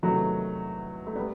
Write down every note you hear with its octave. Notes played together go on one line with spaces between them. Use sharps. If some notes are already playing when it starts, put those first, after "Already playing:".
E2 C3 D#3 F#3 A3
A3
G3 B3